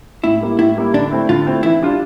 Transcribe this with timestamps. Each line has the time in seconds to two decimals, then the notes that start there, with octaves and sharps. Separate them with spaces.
0.23 A2 E4
0.41 G3 A#3 E4
0.58 A2 E4
0.77 G3 A#3 E4
0.94 D3 D4
1.11 A3 C4 E4
1.29 D3 F4
1.46 A3 C4 E4
1.63 E3 E4
1.82 G3 D4 F4